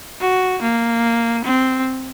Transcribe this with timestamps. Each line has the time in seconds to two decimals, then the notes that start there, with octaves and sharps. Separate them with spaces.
0.21 F#4
0.62 A#3
1.45 C4